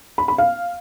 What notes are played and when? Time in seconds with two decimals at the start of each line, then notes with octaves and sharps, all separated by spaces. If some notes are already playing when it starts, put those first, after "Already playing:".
0.18 B5
0.28 B5
0.38 F5